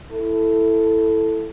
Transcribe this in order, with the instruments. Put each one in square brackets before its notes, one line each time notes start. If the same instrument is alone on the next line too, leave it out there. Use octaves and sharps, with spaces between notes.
[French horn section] E4 A4